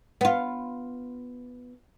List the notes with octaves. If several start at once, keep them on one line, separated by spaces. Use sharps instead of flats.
B3 F4